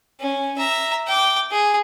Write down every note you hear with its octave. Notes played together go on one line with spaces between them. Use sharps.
C#4
E5 A#5
G5 D6
G#4